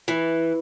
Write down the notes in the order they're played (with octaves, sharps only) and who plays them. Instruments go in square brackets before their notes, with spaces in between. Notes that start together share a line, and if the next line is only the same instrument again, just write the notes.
[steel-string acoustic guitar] E3